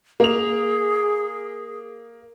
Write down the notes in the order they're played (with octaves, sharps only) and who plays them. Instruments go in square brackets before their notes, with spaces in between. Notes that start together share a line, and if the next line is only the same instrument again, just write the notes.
[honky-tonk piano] A#3 F7 [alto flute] G#4